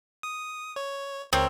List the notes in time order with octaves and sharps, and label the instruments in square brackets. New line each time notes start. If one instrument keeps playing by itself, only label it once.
[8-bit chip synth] D#6
C#5
[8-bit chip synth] C#2 A#4 C#5 [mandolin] C4